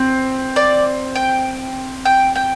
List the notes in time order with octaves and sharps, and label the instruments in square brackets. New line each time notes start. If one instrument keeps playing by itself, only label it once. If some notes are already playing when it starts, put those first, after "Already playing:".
Already playing: [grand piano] C4
[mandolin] D5
G5
G5
G5